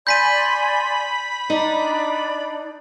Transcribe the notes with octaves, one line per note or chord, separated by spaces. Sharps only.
D5 G#5 B5 C6 G6 B6 D#7
D4 D#4 D5